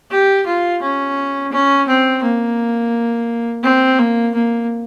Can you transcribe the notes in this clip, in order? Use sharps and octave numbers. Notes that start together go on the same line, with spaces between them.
G4
F4
C#4
C#4
C4
A#3
C4
A#3
A#3